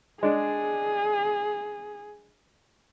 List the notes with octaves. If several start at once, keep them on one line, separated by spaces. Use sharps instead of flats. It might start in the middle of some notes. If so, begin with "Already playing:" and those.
G#3 D4 G#4